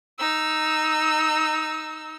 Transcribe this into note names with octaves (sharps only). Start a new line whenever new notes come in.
D#4 E6